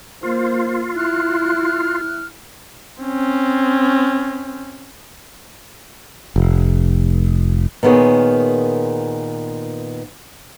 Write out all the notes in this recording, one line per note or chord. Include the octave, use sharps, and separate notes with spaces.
A#3 F4 C5
E4 F6 F#6
C4 C#4
F1
A#2 D#3 B3 G#4 C#5